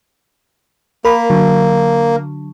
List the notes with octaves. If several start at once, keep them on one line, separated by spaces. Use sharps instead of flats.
A#3 A#4 B5
D3 F#3